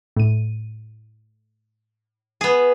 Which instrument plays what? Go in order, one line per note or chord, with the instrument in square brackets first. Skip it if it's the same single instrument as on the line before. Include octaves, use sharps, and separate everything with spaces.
[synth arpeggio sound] A2 D#7
[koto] B3 G#4